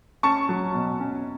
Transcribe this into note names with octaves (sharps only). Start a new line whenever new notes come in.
C#4 A5 C#6
F#3
B2
C#4